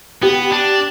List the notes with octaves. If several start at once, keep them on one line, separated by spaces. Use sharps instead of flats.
B3 G4
D4